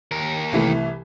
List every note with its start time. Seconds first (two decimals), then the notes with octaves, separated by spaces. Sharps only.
0.11 D#2 A#4
0.52 C2 E3 A3